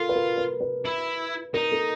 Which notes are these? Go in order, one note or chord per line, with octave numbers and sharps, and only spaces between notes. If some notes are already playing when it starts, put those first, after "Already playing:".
Already playing: F4 A4 A#4
B4
A#4
B4
B4
E4
D#4 A#4
A4